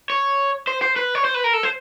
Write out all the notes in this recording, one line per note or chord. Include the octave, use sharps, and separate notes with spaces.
C#5
C5
C5
B4
C#5
C5
B4
A#4
A4
C5